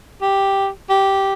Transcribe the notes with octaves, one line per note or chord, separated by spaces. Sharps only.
G4
G4